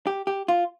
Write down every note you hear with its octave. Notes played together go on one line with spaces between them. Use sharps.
G4
G4
F4